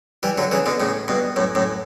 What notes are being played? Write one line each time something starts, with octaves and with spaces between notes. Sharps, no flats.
E3 G3
D3 F#3
C#3 E3
B2 D3
A2 C#3
G2 B2
F#2 A2
F#2 A2